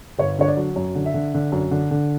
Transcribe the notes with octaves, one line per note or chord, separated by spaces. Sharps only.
G1 C#5
D3 C#5
D5
F#3
F#2
D3
E5
D3
D3
F#2
D3
D3